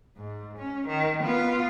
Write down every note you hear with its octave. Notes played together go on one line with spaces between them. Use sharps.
G#2
C#4
D#3
B3 F4